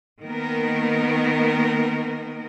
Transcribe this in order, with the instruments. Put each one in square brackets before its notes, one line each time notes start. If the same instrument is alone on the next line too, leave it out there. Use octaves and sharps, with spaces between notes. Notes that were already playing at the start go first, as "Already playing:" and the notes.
[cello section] D#3 A#3 B3 A#4